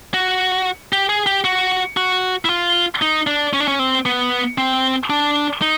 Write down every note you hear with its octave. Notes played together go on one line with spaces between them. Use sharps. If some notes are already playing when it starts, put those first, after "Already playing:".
F#4
G4
G#4
G4
F#4
F#4
E4
F4
D#4
D4
C#4
D4
C#4
C4
B3
C4
D4
D#4